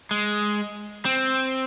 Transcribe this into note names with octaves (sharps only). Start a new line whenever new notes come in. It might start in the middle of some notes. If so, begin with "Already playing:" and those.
G#3
C4